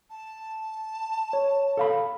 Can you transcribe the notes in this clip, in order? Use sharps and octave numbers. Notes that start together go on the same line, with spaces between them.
A5
C#5
A4 F5 B5